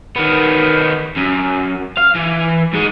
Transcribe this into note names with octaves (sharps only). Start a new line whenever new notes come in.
D#3 B3
F#2
F5
E3
G#2 G#3